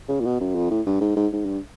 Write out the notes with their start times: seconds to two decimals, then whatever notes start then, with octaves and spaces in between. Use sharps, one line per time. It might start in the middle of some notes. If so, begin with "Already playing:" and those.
0.08 C#3
0.20 A#2
0.25 B2
0.40 F#2
0.55 F2
0.70 A2
0.86 G2
1.01 G#2
1.17 G#2
1.33 G#2
1.45 G2